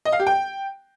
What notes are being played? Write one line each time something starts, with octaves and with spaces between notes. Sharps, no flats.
D#5
F5
G4
G5